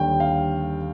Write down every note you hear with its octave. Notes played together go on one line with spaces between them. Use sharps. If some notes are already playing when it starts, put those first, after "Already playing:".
Already playing: D#2 D3 G3 G5
F5